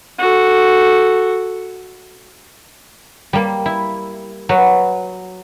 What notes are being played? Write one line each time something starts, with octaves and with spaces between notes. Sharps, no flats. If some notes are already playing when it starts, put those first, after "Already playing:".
F#4 A4
G3 A#3
E4
F#3 B4